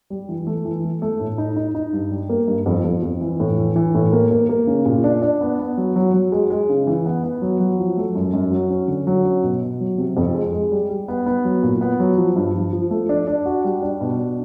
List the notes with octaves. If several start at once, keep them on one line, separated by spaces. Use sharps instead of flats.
G3
E3
A3
E3
A3
A3
A2
D#4
D#4
D#4
G2
G3
A#3
G2
F2
F2
F2
E3
A2
E3
E3
A2
A#3
A#3
A#3
C#3
A#2
D4
D4
B3
B3
F#3
F#3
F#3
G#3
G#3
C#3
E3
B3
B3
F#3
F#3
F3
A3
F#2
F#2
F#3
C#4
D3
F#3
C#4
B2
B2
F#3
C3
F2
G#3
G#3
G3
G3
B3
B3
F#3
A#2
B3
F#3
F3
G2
F3
F3
A3
D4
D4
F#4
G3
D4
B2
D4